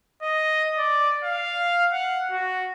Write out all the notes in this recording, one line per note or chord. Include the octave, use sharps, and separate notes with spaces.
D#5
D5
F5
F#5
F#4